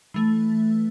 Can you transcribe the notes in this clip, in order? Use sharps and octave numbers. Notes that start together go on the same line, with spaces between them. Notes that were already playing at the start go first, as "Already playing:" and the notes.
E3 A3